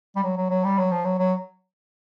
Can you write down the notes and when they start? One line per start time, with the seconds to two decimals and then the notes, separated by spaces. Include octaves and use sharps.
0.16 G3
0.23 F#3
0.36 F#3
0.50 F#3
0.64 G3
0.77 F#3
0.91 F3
1.05 F#3
1.18 F#3